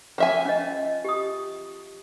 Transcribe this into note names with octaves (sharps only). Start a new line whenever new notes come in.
F3 E5 G#5
C#4 D#5
G4 D#6